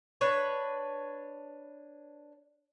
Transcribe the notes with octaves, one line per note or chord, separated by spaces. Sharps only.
D4 B4 C#5